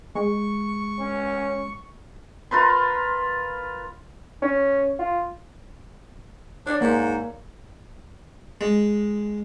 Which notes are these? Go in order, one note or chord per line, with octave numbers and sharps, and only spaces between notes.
G#3 C#6
C#4
F4 A#4 B4 C6
C#4
F4
D4 C#5 D5
G#2 A#3
G#3